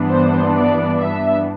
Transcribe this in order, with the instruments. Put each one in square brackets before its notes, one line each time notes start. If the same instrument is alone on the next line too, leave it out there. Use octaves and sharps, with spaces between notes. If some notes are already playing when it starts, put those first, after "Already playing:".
Already playing: [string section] G2 E3 B3 D4
C5
D5
E5